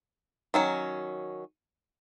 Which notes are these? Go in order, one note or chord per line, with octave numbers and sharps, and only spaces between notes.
D#3 F#3 C#4